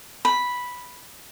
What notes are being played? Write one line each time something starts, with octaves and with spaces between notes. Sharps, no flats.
B5